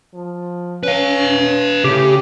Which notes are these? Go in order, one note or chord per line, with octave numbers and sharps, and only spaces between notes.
F3
C#4 B4 F5
A2 C#3 G4